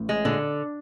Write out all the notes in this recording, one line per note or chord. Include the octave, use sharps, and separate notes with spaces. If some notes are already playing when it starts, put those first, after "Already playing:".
Already playing: A1 A2
G#3
A#2 D3